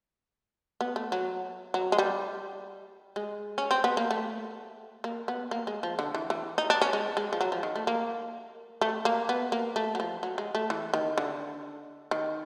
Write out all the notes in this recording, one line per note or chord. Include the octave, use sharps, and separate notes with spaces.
B3
A3
F#3
F#3
G#3
G3
G#3
C#4
C4
B3
A#3
A3
A#3
B3
A#3
G#3
F3
D3
E3
E3
D#4
D4
C#4
G#3
G#3
F3
F#3
F3
D#3
A3
A#3
A3
A#3
B3
A#3
A3
F#3
F3
F#3
G#3
A3
E3
D#3
D3
D#3